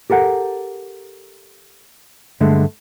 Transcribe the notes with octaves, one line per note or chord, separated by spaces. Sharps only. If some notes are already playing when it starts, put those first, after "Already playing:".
G4 A4 A#4 F#5
G2 D3 G#3 A3